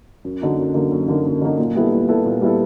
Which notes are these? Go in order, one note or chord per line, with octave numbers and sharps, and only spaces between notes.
F#2
D3 F#3 A#3 D#4
F#2
D3 F#3 A#3 D#4
F#2
D3 F#3 A#3 D#4
F#2
D3 F#3 A#3 D#4
A#2
G3 B3 E4 A4
A#2
G3 B3 E4 A4
A#2
G3 B3 E4 A4